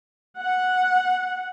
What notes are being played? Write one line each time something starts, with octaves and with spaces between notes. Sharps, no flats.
F#5